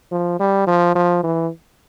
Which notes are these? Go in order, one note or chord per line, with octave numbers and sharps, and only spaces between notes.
F3
G3
F3
F3
E3